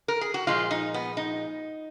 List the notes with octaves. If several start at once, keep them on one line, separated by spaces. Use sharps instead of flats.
A#4
G#4
F#4
A#2 F3 G#3 F4
D#4
B3
D#4